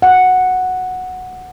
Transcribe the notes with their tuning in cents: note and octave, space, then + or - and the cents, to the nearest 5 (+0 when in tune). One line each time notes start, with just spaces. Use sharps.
F#5 -5